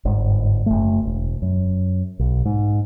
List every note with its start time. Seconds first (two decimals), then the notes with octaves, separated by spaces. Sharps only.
0.05 G1 G#2
0.66 F#1 A3
1.05 E1
1.42 F#2
2.19 B1
2.46 G#2